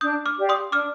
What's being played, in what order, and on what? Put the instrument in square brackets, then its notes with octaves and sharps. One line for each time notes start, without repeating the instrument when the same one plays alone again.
[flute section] D4 [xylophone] D#6 G6
[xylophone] D6 F6
[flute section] G4 D5 F5
[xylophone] C6 D#6
[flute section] D4 [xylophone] D6 F6